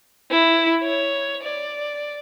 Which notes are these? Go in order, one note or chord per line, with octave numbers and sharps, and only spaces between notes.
E4
C#5
D5